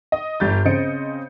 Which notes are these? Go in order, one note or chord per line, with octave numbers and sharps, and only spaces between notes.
D#5
G1 G3 G6 A6
C#3 C4 D#5 C#7 D7